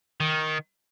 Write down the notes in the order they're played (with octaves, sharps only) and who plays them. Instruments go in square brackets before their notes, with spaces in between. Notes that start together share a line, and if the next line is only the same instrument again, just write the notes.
[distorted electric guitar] D#3